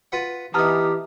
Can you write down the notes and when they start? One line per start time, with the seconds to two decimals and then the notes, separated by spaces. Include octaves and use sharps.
0.12 F4 B4 F#5
0.54 E3 B3 D#4 G4 A5 A#5 F6